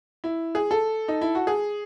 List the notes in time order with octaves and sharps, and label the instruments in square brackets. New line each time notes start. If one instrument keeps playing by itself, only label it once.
[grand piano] E4
G#4
A4
D#4
E4
F#4
G#4